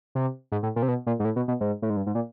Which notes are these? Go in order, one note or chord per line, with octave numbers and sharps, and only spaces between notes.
C3
G#2
A2
A#2
C3
B2
A#2
G#2
A2
B2
B2
G#2
A2
G#2
G2
G#2
A#2